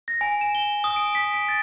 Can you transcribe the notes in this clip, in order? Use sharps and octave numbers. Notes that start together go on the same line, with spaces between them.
A#6
G#5
E7
G7
D#6
D7
B6
D7
A6